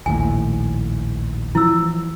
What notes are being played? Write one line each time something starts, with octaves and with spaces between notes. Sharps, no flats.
A#1 D#2 A2 G#5
E3 F3 E4 E6